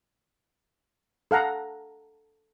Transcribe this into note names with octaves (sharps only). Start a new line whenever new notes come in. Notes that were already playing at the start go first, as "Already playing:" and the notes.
A4 F5 F#5 A#5